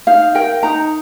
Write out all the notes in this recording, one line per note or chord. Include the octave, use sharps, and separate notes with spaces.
D#4 F5
A#4 G5
D#4 A#5